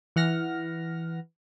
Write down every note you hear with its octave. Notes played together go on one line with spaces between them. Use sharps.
E3 F#5 F6 A#6